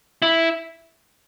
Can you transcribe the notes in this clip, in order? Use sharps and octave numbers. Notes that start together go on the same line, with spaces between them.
E4